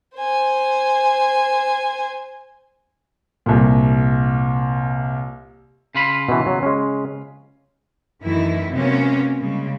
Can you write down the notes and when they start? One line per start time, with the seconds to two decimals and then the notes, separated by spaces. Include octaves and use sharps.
0.15 C5 G#5
3.46 C2 A#2
5.95 C#3 F4 B5
6.29 B2 E3
6.46 F#3
6.63 G#3 C#4
8.23 F#2 D#3 E3 A3 E4
8.72 C3 F#3 G#3 A#3 B3 C#4
9.40 C#3 G3 G#3